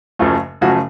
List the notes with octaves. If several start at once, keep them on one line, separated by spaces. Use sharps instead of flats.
F#1 F#2 C#3 F3 A3
F#1 F#2 C#3 F3 A3 F#4